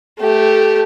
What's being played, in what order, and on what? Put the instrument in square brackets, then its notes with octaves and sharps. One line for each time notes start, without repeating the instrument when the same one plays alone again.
[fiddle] A3 G4